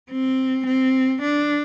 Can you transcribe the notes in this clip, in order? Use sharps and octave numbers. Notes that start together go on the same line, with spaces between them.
C4
C4
D4